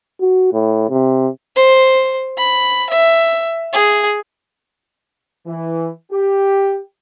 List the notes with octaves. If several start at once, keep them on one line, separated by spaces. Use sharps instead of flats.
F#4
A2
C3
C5
B5
E5
G#4
E3
G4